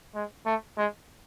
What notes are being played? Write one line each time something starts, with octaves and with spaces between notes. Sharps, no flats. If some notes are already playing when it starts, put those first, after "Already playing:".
G#3
A3
G#3